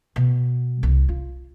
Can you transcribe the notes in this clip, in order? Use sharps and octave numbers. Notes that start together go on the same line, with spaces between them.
B2
C2
F4